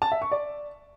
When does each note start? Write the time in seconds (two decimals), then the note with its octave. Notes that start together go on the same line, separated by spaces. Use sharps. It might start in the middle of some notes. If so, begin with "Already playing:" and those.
0.02 A5
0.12 E5
0.22 C#6
0.32 D5